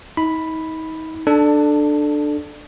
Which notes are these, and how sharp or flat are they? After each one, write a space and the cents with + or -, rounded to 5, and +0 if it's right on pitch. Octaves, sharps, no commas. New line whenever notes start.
D#4 +35 B5 +0
D4 +15 A4 -5